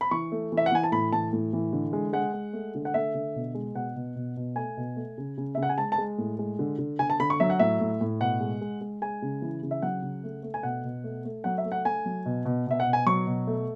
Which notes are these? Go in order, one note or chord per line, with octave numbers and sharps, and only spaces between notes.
B5
E3 C#6
A3
E3
E5
F#5
E3 G#5
A5
A2 B5
E3 A5
A2
E3
D3
G#3
G#3 F#5
G#3
A3
D3
F#5
A3 E5
D3
B2
G#3
B2 F#5
B2
B2
B2
A3 G#5
B2
A3
C#3
C#3
C#3 E5
F#5
G#5
G#3 A5
A5
G#3
A2
G#3
D3
D3
D3 G#5
A5
D3 B5
C#6
F#3 E5
F#5
A2 E5
A2
A2
B2 F#5
G#3
G#3
G#3
G#3 G#5
C#3
E3
C#3
E5
F#3 F#5
C#3
A3
A3
G#5
B2 F#5
B2
A3
A3
F#3 F#5
E5
A3
F#5
A3 G#5
F#3
B2
B2
B2 E5
F#5
B2
G#5
F#3 C#6
B2
A3